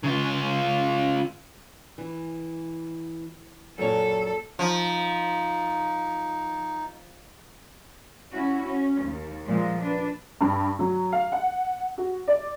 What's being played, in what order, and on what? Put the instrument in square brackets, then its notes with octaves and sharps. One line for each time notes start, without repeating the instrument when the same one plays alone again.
[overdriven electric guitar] C#3 F4
[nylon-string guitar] E3
[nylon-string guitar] F#2 A#2 C#5 [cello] A4
[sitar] F3 [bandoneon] D#4
[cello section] C#4 E4 F#4
C#4
D#2
A#2 F3 G#3
D4 B4
[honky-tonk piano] G2
F#3
F5
F#5
F#4
D5